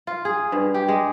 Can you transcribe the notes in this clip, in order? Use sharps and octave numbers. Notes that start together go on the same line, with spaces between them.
F4
G#4
G2
G4
G#3